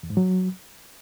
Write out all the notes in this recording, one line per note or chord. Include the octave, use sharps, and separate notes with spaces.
E2
G#2
F#3